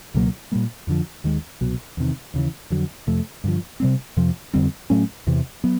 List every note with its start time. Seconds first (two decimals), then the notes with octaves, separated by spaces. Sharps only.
0.14 C#2 B2 F#3 A#3
0.52 A#2 G3 A#3
0.87 F2 D3 F3
1.24 D#2 D#3 G#3
1.61 C2 B2 F#3
1.97 E2 C3 D#3
2.34 D#2 C#3 E3
2.70 F2 D3 F#3
3.07 F2 C3 F3 A3
3.44 G2 D3 F3
3.80 C3 D#3 G3 C4
4.17 F2 C3 F3
4.53 F2 D3 G3 C4
4.90 A2 F#3 A3 C#4
5.27 E2 C3 E3
5.64 F#3 B3